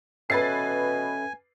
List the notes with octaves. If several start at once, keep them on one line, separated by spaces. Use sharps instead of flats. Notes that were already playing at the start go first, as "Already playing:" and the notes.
B2 C#4 A4 B4 E5 G#5 A6 C7